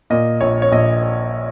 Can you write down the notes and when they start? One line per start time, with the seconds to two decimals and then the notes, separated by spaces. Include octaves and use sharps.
0.10 A#2 D#5
0.41 A#1 C#5
0.62 C#5
0.72 A#1 D#5